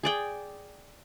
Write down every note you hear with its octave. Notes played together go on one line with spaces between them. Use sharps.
G#4 D5 G5